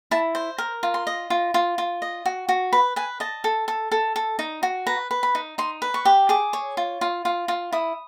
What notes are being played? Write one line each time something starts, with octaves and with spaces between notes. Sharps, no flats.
E4 A5
C5
A#4
F4
C6
D#5
F4
F4
F4
D#5
F#4
F#4
B4 B5
B4 G#5
D#5 A5
A4
A4
A4
A4
D#4
F#4
B4 A#5
B4
B5
D#4
D#4 C6
B4
C#6
G4
G#4 D6
C#5
F4
F4
F4
F4
E4 D#6